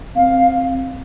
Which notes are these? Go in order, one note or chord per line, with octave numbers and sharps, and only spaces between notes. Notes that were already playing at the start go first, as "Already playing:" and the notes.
C4 F5